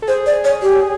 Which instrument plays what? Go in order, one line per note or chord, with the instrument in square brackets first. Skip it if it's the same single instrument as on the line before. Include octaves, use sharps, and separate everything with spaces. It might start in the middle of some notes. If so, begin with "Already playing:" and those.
[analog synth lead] A4
[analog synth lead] G#4 [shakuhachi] C5
[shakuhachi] D5
C#5
G4